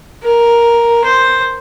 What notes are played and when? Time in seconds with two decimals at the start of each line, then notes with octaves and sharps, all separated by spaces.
0.24 A#4
1.04 C5